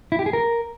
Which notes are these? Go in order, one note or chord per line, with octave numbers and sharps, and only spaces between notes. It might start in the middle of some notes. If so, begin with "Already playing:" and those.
E4
G4
G#4
A#4